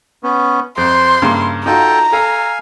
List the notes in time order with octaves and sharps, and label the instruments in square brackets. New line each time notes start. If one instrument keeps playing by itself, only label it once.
[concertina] B3 C#4
[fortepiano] F2 [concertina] C5 [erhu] C6
[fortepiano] G2 C#3 A#3 [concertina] E4
[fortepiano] D#4 F4 F#4 [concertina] A4 G5 [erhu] A#5
[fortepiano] A4 [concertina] F5 G#5